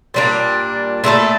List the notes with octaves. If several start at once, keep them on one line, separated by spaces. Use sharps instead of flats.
A#2 G3 A#3 D4
A#2 A3 E4 A4